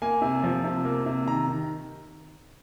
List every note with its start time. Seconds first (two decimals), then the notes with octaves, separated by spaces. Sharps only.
0.02 A#3 G#5
0.22 C3
0.44 F3
0.64 C3
0.85 A#3
1.06 C3
1.26 D#3 A#5
1.48 D#3